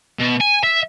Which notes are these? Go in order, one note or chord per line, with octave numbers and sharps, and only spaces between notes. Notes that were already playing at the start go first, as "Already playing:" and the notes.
B2
G#5
E5